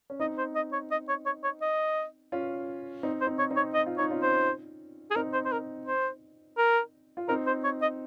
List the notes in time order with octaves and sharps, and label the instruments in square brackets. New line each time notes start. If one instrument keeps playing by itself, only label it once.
[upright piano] C#4
[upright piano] C4 D#4 [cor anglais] D#5
[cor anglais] C5
D#5
C#5
D#5
C#5
C#5
C#5
D#5
[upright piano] C#4 F4
C4 D#4
[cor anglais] C5
[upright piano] C4 D#4
[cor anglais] C#5
[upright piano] C4 D#4
[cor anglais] C#5
D#5
[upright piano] F4
[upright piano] D#4 [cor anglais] C#5
[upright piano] C#4 F4
[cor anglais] C5
G#4
[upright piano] C4 D#4 [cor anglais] A#4
[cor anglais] C5
C5
A#4
C5
A#4
[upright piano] F4
[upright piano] C4 D#4 [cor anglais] A#4
[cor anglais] C5
C#5
D#5